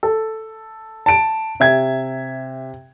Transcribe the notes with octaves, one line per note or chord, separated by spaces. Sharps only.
A4
A5 D7
C3 E5 G#6